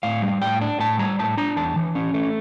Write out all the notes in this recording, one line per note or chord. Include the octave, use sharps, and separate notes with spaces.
A2 F5
G3
A2 G5
D4
A2 A5
G3 A#5
A2 A5
D4 A#5
E2 A5
E3
C#4
A3